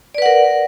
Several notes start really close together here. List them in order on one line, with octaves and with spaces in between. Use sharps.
D5 B4 F#5 A#4